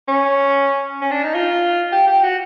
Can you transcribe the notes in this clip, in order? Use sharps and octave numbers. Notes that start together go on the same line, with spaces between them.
C#4
C#4
D4
D#4
F4
G4
G4
F#4